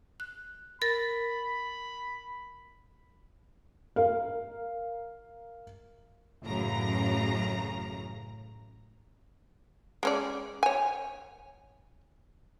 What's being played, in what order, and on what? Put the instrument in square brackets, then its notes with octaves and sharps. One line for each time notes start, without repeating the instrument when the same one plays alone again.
[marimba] F#6
[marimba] A#4 A6 [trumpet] B5
[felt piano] A#4 F5
[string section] A1 F#2 C#3 A#5
[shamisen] G#3 C#4 D5
C#5 G#5